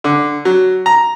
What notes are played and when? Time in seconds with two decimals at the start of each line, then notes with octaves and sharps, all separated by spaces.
0.04 D3
0.45 F#3
0.86 A#5